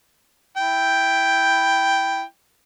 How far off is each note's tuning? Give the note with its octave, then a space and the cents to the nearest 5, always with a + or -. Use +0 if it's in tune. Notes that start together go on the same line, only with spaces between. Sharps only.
E4 +0 G5 +0